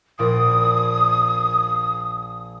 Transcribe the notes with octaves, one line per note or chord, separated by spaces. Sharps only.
A#1 A#2 D#6 D7